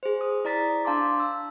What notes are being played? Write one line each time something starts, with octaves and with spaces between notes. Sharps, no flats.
G#4 C5
D#6
E4 D5 A#5 A6 B6
D4 F5 A5 C6 D6
E6